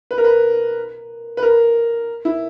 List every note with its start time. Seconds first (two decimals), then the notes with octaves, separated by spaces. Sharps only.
0.11 B4
0.18 A#4
0.24 B4
1.37 B4
1.43 A#4
2.25 E4